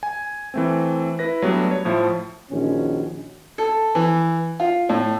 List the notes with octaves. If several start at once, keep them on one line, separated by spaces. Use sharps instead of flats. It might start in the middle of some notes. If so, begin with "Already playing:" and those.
G#5
E3 A3 C4
E4 B4 A#6
F#3 G3 A3 B3 D4
C#5
A2 F3 A3
A#1 D#3 C#4 F#4
A4
E3
F4
A2